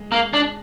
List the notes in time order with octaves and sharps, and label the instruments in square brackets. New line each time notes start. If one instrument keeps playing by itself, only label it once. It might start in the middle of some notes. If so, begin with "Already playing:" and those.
Already playing: [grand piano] G#3
[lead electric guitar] A#3
D4